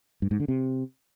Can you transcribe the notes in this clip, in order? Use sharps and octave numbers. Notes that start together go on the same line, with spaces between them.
G2
G#2
D3
C3